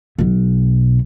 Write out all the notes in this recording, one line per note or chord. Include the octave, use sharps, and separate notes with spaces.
B1 B2